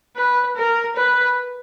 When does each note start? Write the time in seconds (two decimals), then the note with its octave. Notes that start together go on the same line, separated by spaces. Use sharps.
0.16 B4
0.57 A#4
0.96 B4